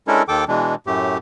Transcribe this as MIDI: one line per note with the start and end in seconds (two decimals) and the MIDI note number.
0.08 0.23 56
0.08 0.23 61
0.08 0.23 62
0.08 0.23 64
0.08 0.23 69
0.08 0.23 70
0.28 0.44 39
0.28 0.44 51
0.28 0.44 69
0.28 0.44 79
0.28 0.44 86
0.48 0.75 47
0.48 0.75 52
0.48 0.75 56
0.48 0.75 62
0.87 1.18 42
0.87 1.18 45
0.87 1.18 57
0.87 1.18 67